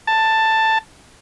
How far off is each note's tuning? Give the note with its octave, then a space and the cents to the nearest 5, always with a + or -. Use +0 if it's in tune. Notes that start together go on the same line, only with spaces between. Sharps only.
A5 +10